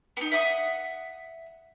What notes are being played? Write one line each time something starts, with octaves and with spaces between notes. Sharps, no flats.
B3 D#4
E5 F#5 D#6